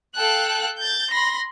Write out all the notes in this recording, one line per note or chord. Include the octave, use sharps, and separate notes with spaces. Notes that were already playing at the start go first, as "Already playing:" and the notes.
A4 F5 G5 F#6
G6 A6
B5 C6 A#6